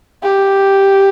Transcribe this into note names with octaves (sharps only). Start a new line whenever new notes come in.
G4